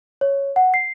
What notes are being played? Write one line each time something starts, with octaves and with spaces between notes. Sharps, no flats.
C#5
F#5
C7